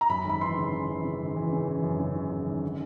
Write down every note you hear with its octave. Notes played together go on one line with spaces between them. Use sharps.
A#5
F#2 B5
G#1 B5
E3 C6
C#3
C#3
E3
C#3
G#1
E3
C#3
E3
F#2
C#3
C#3
F#2
G#1
D3